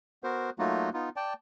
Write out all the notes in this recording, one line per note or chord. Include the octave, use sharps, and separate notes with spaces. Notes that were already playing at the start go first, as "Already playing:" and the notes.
B3 F#4 A#4 C5
F#3 A3 A#3 D#4 F4 F#4
B3 D#4 F4
D5 G5 A5